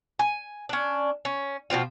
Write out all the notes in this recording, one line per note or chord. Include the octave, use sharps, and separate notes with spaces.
G#5
C#4 D4
C#4
B2 F3 C4 F4